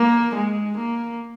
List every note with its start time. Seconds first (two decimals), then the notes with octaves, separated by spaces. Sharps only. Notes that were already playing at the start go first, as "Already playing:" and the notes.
Already playing: A#3
0.34 G#3
0.77 A#3